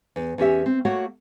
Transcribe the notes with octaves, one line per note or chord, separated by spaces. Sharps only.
E2
E2 C#4 G4 E5
C4
A3 A#3 F#4 C#5 F#5